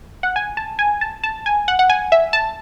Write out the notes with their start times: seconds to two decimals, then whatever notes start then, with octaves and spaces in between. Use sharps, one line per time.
0.23 F#5
0.36 G#5
0.57 A5
0.79 G#5
1.01 A5
1.24 A5
1.46 G#5
1.68 F#5
1.79 F#5
1.90 G#5
2.12 E5
2.33 A5